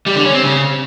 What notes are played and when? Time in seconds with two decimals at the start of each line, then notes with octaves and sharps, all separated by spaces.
0.06 G3
0.16 D3
0.25 C#4
0.34 C4
0.43 C#3